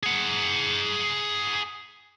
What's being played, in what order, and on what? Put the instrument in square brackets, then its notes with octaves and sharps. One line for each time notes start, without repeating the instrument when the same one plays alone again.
[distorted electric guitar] G#4 F#5